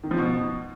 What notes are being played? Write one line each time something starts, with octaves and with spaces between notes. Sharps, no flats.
D#3
F3
B2